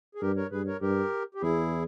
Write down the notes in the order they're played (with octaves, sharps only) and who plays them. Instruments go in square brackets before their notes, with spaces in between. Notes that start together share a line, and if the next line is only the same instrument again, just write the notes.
[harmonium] G#4
[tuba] G2 [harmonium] G4 A#4
[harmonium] A#4 C#5
[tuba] G2 [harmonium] G#4 B4
[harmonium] A#4 C#5
[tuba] G2 [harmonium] G4 A#4
[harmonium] G4
[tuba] E2 [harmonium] E4 G#4